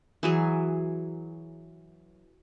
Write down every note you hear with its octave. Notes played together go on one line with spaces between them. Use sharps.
E3 F#3 G#4